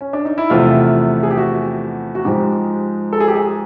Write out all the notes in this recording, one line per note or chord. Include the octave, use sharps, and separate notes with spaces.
C#4
D4
D#4
E4
E2 C3 F3 A3 F4
G#4
G4
F#4
F#4
G#2 F3 G#3 G4
A4
G#4
G4
G#4